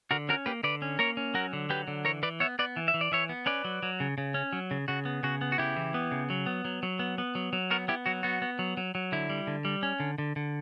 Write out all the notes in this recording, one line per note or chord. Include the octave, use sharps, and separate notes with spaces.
D3 F#4 A#4
C#4 F#4 A#4
A#3 G4 B4
D3 B4 D5
C#4
A#3 A#4 C#5
C#4
F#3 F#4 A#4
D3
F#3 G4 B4
D3
E3 A#4 C#5
E3 B4 D5
B3 C#5 E5
B3 B4 D5
E3
E5
E3
D5
E3 C#5 E5
B3
C#4 B4 D5
F#3
F#3
C#3
C#3
C#4
F#3
C#3
C#3 F#4
B3
C#3 F#4
B3
F#4
C#3 E4 G4
E3
B3
C#3
F#3
B3
F#3
F#3
B3
B3
F#3
F#3
B3 F#4 A#4
B3 E4 G4
F#3 F#4
B3 F#4
B3
F#3
F#3
F#3
D3 E4
G3
D3
G3
C#4
D3
D3
D3